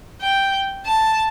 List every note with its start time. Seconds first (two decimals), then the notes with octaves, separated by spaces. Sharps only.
0.22 G5
0.86 A5